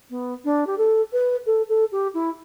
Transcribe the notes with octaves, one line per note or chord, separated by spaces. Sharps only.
B3
D4
G4
A4
B4
A4
A4
G4
E4